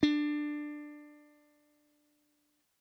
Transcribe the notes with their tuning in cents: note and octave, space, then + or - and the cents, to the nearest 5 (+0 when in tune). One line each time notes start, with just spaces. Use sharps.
D4 +15